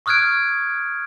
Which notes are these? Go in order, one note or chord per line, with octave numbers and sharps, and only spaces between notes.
C#6 D#6 F6 F#6 G#6 D7